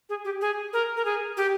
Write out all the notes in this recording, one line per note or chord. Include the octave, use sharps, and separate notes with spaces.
G#4
G4
G#4
A#4
A#4
G#4
G4